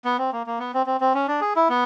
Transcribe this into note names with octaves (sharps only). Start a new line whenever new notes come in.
B3
C4
A#3
A#3
B3
C4
C4
C4
C#4
D4
G#4
E4
B3